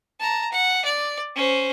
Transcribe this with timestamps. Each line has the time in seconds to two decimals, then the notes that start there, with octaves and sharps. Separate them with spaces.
0.20 A5 A#5
0.52 F#5
0.85 D5
1.36 C#4 C5